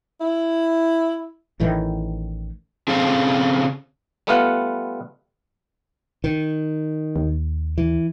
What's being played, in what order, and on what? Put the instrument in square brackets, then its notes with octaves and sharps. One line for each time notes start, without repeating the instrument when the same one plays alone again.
[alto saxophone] E4
[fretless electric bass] A1 A2 D#3 E3
[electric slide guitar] C#3 C4 G#4 A4 C5 F5
[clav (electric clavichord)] G3 A3 B3 F4 F5 F#5
[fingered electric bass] D#3
[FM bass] D#2
[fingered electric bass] E3